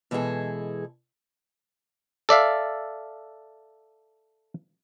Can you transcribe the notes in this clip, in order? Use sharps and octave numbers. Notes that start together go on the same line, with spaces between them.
B2 E3 G#3 F#4 G#4 A4
A4 D5 E5 F5